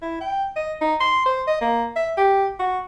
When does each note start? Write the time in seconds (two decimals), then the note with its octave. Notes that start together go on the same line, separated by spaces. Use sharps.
0.02 E4
0.21 G5
0.56 D#5
0.81 D#4
1.00 C6
1.26 C5
1.47 D#5
1.61 A#3
1.96 E5
2.17 G4
2.59 F#4